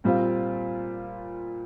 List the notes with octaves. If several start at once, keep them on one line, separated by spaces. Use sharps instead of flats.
A#2 G3 C4 F4